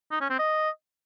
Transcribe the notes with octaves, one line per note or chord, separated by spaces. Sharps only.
D#4
C#4
C4
D#5